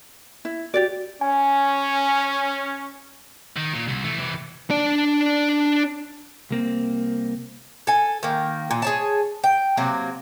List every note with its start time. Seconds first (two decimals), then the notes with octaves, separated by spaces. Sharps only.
0.45 E4
0.74 F#4 G4 D5 A6
1.21 C#4 G#5
3.57 D#3
3.73 A#2
3.88 C2
4.04 E3 A3
4.19 C3 E3
4.70 D4 D5
6.51 C2 A#3 C4
7.87 A4 G#5
8.23 D#3 A#3
8.71 A#2
8.82 G#4 C#5 A5
9.44 G5
9.77 C3 F#3 A#3